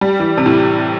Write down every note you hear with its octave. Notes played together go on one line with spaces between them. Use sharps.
G3
E3
C3
A2